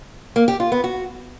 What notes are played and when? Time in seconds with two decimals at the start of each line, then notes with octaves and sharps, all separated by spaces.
0.36 A#3
0.48 G4
0.60 F4
0.72 B3
0.84 F#4